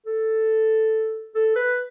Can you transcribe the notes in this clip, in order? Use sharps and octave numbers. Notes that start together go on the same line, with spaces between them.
A4
A4
B4